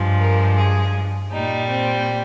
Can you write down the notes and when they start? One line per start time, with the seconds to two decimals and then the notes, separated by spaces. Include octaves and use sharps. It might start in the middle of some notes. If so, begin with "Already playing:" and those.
Already playing: G2 F3 G#3
0.19 A#4
0.57 G#4
1.31 A#2 G3 D#4
1.69 C4